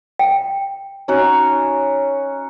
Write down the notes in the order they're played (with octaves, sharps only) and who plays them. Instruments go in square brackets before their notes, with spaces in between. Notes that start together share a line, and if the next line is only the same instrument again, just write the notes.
[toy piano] G5
[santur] C#4 D#4 F#4